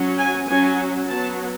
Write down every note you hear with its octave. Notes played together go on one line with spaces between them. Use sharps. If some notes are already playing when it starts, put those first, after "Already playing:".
Already playing: F#3 C#4
G#5
F#3 C#4 G#5
F#3 B3 A5